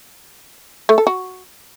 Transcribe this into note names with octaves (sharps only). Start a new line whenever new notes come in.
A3
A4
F#4